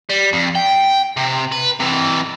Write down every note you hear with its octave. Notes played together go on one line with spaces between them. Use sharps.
G3
F2
G5
C3
B4
C3 E3